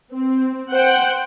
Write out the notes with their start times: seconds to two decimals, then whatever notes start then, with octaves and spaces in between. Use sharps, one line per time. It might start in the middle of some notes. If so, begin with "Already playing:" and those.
0.11 C4
0.70 C5 F#5 G5